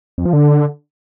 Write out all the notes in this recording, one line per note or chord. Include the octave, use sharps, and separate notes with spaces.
F2
F3
D3